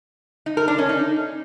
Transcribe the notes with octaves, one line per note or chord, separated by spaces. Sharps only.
D#4
A#4
D4
C#4
D#4